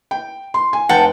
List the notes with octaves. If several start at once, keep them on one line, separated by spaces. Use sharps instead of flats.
G5
C6
G#5
F1 F#5 G5 A5